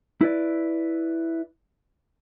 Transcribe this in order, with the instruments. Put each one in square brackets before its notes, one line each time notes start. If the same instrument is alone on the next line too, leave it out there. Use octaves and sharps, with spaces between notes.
[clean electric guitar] E4 B4 D5